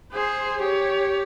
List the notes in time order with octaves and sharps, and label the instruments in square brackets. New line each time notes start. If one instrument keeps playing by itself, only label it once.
[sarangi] G#4 [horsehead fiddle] C5
[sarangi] G4 [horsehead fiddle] C#5